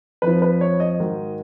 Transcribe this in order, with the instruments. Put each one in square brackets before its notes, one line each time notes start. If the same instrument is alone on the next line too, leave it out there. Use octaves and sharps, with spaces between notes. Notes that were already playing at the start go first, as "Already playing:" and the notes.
[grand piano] F2 F3 B4
B4
C#5
D#5
G#2 D#3 F#3